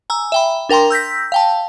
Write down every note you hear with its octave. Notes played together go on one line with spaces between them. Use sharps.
G#5 A#5 E6
E5 G5 B5
D4 A#4 G5 A#5 C6
E6 G6 A#6 B6
F5 G5 A5